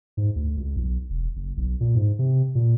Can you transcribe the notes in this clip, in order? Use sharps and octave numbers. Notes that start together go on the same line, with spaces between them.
G#2
D2
C#2
B1
E1
F#1
B1
A#2
G#2
C3
A#2